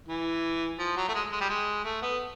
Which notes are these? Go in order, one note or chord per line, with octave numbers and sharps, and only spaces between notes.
E3
F3
F#3
A3
G#3
G#3
G3
G#3
A3
B3